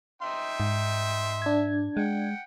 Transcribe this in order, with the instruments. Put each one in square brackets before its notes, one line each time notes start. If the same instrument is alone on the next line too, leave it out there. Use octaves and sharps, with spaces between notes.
[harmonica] D#4 G5 C6 [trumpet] E5
[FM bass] G#2
[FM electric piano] D4 G#6
[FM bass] G#3 [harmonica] F#5 G5